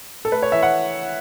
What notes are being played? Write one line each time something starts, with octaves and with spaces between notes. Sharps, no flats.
A4
A3 B4
C#5
E3 E5
F#5